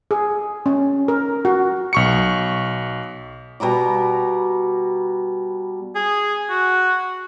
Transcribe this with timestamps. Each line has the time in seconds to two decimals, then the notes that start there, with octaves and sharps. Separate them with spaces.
0.11 G#4
0.66 C#4
1.08 A#4
1.45 F#4
1.93 B1 C#6 C#7
3.60 B2 G3 A#5 D6
5.95 G#4
6.50 F#4